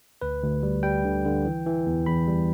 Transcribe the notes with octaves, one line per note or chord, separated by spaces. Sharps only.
D2 B4
D2
G3
G3 G5
D3
D3
E3
E3
E2
E2 B5
G3